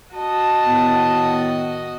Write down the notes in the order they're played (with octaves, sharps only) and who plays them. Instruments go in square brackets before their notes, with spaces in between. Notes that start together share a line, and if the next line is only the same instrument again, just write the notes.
[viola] F#4 D#5 [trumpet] A5
[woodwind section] A2 D#3 B3